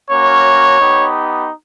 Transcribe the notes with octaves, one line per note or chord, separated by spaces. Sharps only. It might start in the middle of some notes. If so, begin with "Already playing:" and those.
A#3 C#4 F#4 C#5
B3 D#4 G4